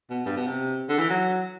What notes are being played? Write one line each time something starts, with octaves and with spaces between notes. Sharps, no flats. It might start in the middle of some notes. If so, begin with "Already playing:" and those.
B2
G2
B2
C3
D3
E3
F#3